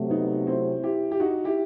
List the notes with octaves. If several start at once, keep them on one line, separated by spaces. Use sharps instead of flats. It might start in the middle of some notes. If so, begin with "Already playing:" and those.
Already playing: C3 F#3 A3
B3 D#4
C4 E4
E4 G4
G4
D#4 F#4
E4 G4